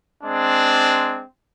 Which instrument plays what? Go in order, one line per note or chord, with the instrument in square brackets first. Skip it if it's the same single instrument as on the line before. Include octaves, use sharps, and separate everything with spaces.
[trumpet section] G#3 C4 D4